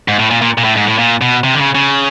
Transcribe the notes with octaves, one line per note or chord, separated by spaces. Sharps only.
G#2
A2
A#2
A#2
A#2
A2
G#2
A2
A#2
B2
C3
D3
C#3
C#3